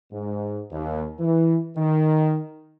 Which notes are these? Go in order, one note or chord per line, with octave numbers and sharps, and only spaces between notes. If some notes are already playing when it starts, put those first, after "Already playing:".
G#2
D#2
E3
D#3